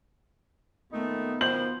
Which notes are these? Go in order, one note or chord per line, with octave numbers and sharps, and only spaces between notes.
A#2 D#3 A3 B3 D#4
B2 D#3 F3 C5 G6 F#7